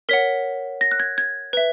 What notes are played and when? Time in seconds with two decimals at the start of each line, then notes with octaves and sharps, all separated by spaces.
0.09 A#4 C#5 F#5 B6
0.81 A#6
0.91 F#6
1.00 G#6
1.18 G#6
1.53 B4 E5